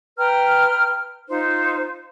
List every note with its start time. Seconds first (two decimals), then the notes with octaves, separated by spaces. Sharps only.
0.18 B4 G5 A#5 F6
1.28 D#4 F4 C5